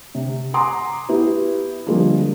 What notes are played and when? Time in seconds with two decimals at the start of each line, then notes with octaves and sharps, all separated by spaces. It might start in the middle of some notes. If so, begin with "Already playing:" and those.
0.15 C3
0.54 F#5 G#5 A#5 C6 D6 D#6
1.09 B3 E4 G4
1.86 D3 F3 G3 G#3 A#3 C4